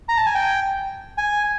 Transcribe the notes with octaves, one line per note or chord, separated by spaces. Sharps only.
A#5
A5
G#5
G5
G#5